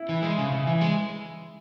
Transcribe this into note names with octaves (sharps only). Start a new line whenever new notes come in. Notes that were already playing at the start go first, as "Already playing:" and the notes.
Already playing: E4
E3
G#3
C#3
C#3
E3
G#3